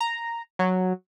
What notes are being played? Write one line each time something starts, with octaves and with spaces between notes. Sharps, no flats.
A#5
F#3